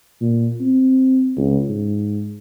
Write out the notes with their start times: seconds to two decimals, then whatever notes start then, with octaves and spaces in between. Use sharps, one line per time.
0.21 A#2
0.61 C4
1.37 C#2
1.69 G#2